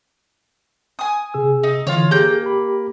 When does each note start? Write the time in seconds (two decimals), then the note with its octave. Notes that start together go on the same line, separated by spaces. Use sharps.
0.99 G#5 D#6
1.34 C3 G#4 E6
1.63 D#4
1.87 D3 E3 F4 C#5
2.11 A#3 G4 G#4 G6
2.43 G4 B5